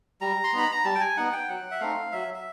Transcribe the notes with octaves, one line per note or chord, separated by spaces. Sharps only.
G3 A#5
C6
B3 D#4 B5
A#5
G3 A5
G5
G#5
B3 D#4 F#5
G5
F#3 F#5
E5
A3 C4 D#4 F5
F#3 E5
E5